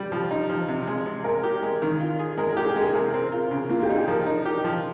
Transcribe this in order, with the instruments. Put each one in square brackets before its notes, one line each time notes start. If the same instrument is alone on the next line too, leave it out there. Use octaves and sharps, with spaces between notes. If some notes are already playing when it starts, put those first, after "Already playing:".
Already playing: [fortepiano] G3 [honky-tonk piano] G4
[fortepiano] F3
D#4
F3
C3
G#3
C3
[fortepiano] G#3 [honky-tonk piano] A#4
[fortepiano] G4
G#3
D#3
F4
G#4
[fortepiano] G#3 [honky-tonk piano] A#4
[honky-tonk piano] G#4
[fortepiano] G4
[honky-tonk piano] G#4
[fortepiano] G#3
[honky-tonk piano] G#4
[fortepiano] C3 [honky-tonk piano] A#4
[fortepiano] C4
F4
C#3
[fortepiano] A#3 [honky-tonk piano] F4
[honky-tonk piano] G4
[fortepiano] D#4
[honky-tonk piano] G#4
[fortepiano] F3 [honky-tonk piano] A#4
[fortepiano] D#4
G4
F3